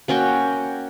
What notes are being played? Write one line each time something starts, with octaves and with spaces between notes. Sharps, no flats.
A#3 C#4 F#4 G5